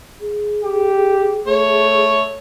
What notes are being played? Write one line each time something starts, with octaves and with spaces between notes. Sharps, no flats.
G#4
G4
A3 C#5